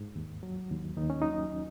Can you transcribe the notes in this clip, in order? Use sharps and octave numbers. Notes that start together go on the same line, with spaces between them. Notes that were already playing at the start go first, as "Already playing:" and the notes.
Already playing: G#2
D#2
F#3
D#2
D#2 D#4
C#4
F#3 D#4